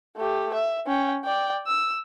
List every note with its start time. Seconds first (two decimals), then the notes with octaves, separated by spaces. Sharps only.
0.16 A3 G4
0.54 E5
0.86 C#4 G5
1.24 D5 G5
1.67 E6